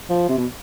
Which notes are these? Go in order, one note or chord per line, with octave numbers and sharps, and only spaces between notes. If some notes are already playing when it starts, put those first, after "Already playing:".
F3
C3
B2